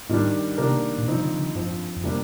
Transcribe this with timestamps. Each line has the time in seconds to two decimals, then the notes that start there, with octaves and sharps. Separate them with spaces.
0.09 G#2 D#3 G3 D4
0.58 C3 D#3 A#3 D4 G4 A#4
0.98 A#2
1.07 G2 C3 F3 C4 D#4
1.23 D3
1.39 D3
1.55 G2 D3 F3 C4
1.96 F2
2.04 C3 G3 A#3 D4